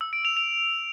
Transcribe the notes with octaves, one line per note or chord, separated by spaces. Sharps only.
E6
D7
F7
F7